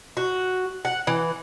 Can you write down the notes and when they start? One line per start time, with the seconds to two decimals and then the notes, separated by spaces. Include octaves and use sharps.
0.17 F#4
0.85 F#5
1.07 E3